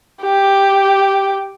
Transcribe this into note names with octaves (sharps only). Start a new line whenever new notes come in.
G4